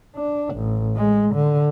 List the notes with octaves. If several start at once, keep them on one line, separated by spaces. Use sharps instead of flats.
D4
A1
G#3
D3